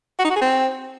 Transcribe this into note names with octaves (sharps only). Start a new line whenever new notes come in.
F#4
D#4
F#4
G#4
C4